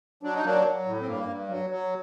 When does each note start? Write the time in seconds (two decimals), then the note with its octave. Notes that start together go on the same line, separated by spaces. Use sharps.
0.23 F#3 D4
0.34 D#4
0.44 F#3 A#3 D4
0.65 F#3
0.86 A2
1.00 C4
1.07 G2 A#3
1.28 G2
1.49 F#3
1.70 F#3